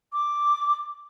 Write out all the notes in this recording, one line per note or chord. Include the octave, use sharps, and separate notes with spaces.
D6